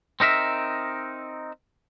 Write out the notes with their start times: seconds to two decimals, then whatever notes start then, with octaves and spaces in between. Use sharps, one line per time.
0.20 C4 D#4 A#4 E5